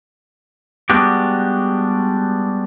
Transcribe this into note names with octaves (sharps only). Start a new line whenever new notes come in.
G3 G#3 B3 D4 F#4 G4